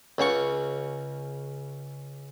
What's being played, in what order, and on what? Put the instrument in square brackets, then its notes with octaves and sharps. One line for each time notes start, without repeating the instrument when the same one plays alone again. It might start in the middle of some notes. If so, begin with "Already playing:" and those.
[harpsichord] C#2 C#3 F#5 C#6